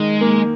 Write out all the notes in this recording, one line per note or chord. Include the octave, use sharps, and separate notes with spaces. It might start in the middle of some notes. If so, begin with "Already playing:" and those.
Already playing: D#3 G#3 D#4
A#3